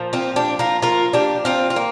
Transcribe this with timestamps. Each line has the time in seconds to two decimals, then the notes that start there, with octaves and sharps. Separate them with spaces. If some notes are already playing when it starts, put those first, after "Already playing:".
Already playing: A#2 F3
0.13 C4 F4
0.36 D4 G4
0.59 F4 A#4
0.82 F4 A#4
1.13 D4 G4
1.45 C4 F4
1.70 F4
1.76 A#3